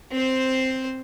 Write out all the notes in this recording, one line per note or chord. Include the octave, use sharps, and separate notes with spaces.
C4 C5